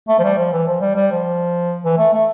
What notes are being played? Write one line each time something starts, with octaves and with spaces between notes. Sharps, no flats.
A3
F3
G3
F3
E3
F3
G3
G3
F3
E3
A3
A3